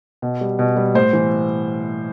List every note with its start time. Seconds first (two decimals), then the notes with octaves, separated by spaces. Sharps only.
0.22 B2
0.41 G3
0.59 B2
0.76 G3
0.95 A2 C5
1.13 E3